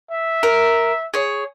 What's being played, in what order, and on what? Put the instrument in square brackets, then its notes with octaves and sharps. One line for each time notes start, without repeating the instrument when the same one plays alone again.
[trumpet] E5
[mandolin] A#4
G#4 C#5